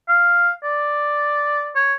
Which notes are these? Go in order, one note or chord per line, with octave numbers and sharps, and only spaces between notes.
F5
D5
C#5